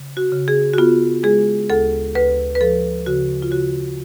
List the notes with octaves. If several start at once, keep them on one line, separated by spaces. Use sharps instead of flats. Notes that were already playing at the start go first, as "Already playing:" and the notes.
Already playing: C#3
F#4
C#3
G#4
F#4
B3 F4
G#3 G#4
D2 A4
D2 B4
B4
F3 A4
C#3 F#4
F4
C#3 F#4